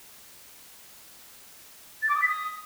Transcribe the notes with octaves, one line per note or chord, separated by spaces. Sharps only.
A6
D6
D#6
B6
D#6